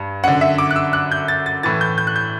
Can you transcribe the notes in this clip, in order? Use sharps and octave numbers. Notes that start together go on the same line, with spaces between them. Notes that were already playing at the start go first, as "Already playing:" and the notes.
Already playing: G2
F#2 D3 F#5
E5
D6
F#6
E6
F#6
G6
A6
A6
A2 E3 A6
G6
G6
F#6
G6